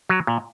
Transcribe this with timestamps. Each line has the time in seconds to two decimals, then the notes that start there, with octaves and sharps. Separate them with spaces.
0.09 F#3
0.27 A#2